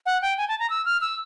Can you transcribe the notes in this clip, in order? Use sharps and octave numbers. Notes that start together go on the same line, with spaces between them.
F#5
G5
G#5
A5
A#5
E6
F6
E6